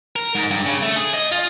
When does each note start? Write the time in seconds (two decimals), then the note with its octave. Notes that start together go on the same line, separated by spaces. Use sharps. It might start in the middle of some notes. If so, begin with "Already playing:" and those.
0.16 A#4
0.35 G#2
0.51 G2
0.66 C#3
0.82 A3
0.96 G#4
1.14 D#5
1.32 F4